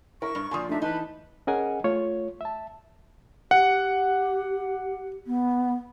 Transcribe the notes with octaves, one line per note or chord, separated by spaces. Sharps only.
E4 A#4 C#6
G2
A#2 F3 D5 G#5 C6 D#6
A3 D4 D#4 E5
E3 D#4 B4 A5 B5
C#4 G#4 A#4 D#5 F#5 G#5
A3 F4 C#5
E5 A5
G4 F#5
B3